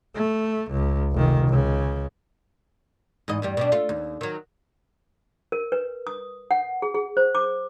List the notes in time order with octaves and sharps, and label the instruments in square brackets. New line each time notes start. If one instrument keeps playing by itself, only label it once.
[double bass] A3
C#2
F1 D#3
C#2 C#3
[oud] G#2 E3 D#5
E2 G2 G3
B2 G3 D4
A3 F4
D#2
D#3 F#3
[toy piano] A#4
B4
D#6
F#5
G#4
G#4
C5
D6